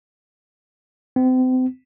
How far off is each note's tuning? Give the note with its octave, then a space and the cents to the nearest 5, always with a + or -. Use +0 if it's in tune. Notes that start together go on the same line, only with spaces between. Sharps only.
C4 -35